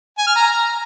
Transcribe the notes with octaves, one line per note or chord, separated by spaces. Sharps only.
G#5
F6
A#5